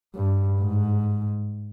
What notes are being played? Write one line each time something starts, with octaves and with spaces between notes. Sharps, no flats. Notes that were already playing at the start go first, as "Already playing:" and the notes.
G2
G#2